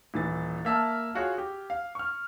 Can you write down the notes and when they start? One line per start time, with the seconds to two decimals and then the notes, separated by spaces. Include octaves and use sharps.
0.14 D#1 E3 A6
0.65 A#3 E5 A5 F6
1.15 F4 F#4 G#4 C#5
1.38 G4
1.70 F5
1.95 C#6 F6